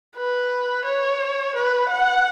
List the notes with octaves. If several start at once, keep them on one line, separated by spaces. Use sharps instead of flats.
B4
C#5
B4
F#5